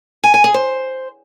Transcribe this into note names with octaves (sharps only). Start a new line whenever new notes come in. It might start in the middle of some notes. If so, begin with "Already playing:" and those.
G#5
G#5
G#4
C5